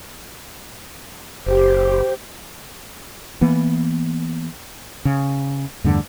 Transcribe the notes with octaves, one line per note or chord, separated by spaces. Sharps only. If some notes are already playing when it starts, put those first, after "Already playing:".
F#1 G4 C5
E3 A#3 B3
C#3
E2 G2 D3 A3